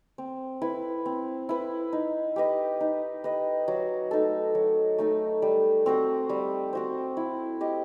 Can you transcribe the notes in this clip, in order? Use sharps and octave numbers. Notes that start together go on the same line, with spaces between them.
C4
E4 B4
C4
E4 B4
D#4
G4 B4 D#5
D#4
G4 B4 D#5
F#3
A3 D#4 A4
F#3
A3 D#4 A4
G3
C4 F#4 C5
G3
C4 F#4 C5
E4
G4 D#5